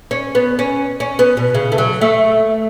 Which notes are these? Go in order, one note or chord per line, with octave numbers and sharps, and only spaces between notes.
C#4
B3
C#4
C#4
B3
B2
C#3
A3
F#3
A3